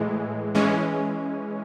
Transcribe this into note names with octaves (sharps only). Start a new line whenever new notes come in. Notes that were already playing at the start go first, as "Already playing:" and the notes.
Already playing: A2 E3 G#3
E3 G#3 C#4